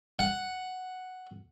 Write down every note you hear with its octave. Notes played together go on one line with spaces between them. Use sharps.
F#5